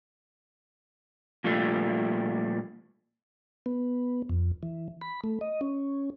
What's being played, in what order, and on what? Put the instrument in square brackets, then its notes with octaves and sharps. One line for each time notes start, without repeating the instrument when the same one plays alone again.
[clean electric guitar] A#2 F3 G3 A3
[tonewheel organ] B3
F2
E3
B5
A3
D#5
C#4